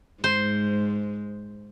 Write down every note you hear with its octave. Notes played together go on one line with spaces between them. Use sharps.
G#2 G#3 C5